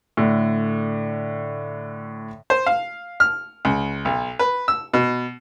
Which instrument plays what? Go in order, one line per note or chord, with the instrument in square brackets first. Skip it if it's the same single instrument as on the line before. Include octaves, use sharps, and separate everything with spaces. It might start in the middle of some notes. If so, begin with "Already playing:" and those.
[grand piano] A2 D3
[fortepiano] C5
F5
F6
C#2
B1
B4
E6
B2